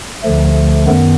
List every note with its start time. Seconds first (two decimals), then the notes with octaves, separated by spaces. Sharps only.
0.24 D2 D3 F3 A3
0.87 F#2 D#3 B3